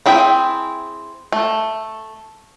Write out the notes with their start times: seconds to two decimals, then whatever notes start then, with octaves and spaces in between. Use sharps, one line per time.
0.06 C4 E4 G#4 E5 G5
1.32 A3